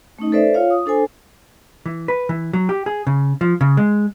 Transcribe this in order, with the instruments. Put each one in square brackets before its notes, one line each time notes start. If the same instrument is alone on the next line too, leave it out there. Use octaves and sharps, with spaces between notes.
[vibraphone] A3 C#4 D#4 D#5
A4 B4 C5 D5 E5
F4 C#5 F5
D#6
D4 A4 C5 G#5
[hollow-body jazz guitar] E3
B4
E3
F#3
G4
G#4
C#3
F3
C#3
G#3